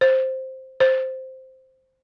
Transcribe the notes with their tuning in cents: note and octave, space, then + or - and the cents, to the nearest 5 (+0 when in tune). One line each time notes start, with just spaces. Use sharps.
C5 +5
C5 +0